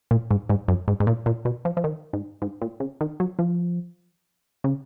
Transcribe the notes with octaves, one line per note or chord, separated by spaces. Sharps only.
A#2
G#2
G#2
F#2
G#2
G#2
A#2
A#2
B2
F3
F3
D#3
G#2
G#2
A#2
C#3
D#3
F#3
F3
C#3